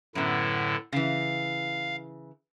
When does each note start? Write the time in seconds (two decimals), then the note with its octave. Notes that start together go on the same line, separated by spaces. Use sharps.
0.15 F#2 A2 D3 B3 E4
0.92 C#3 E3 F5